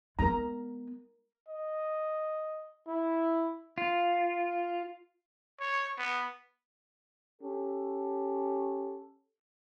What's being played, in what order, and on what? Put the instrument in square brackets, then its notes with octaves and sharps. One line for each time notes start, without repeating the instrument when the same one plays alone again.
[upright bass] G#3 B3 [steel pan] A#4 A#5
[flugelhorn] D#5
E4
[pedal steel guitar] F4
[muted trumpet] C#5
B3
[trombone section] C#4 G4 A4